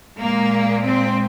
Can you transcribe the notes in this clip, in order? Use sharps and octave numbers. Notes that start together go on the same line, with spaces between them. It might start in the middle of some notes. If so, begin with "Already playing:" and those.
A#2 G#3 A#3
C4